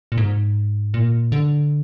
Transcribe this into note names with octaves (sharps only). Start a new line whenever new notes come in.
A#2
G#2
A#2
D3